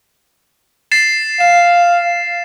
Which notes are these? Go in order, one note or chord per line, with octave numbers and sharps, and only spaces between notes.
A6 C7 E7
F5 E7